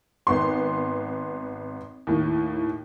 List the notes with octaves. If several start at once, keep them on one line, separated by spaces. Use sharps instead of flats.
G#1 B3 C6
D#2 A2